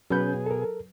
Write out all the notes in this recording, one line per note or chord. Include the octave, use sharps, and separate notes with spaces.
B2 F#3 C#4 G#4 B4 G6
A4 A#4